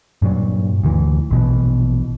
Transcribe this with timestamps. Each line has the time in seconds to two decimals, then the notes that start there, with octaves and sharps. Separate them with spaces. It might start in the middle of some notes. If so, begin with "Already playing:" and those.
0.22 G2 A#2 F#3
0.83 D2 E3
1.30 A#1 B2 E3